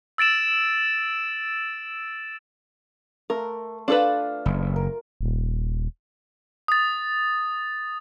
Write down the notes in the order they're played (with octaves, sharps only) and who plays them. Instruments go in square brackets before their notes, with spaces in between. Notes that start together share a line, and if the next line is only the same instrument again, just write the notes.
[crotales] E6 A6 D7 E7
[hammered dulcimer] A3 C6 [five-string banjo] A#4
[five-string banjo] D4 A4 B4 [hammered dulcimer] F4
[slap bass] F#1
[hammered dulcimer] A#4
[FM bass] D#1
[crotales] D#6 A6